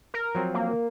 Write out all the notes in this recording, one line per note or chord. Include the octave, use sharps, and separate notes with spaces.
A#4
F3 F#3 C4
A#3